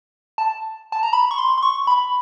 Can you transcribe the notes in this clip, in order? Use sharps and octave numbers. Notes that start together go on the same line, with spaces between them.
A5
A5
A#5
B5
C#6
C6
C6
C#6
B5